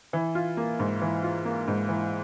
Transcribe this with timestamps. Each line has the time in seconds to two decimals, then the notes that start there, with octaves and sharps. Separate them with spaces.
0.13 E3
0.35 F4
0.57 A#3
0.79 G#2
1.02 E3
1.23 F4
1.45 A#3
1.68 G#2
1.89 E3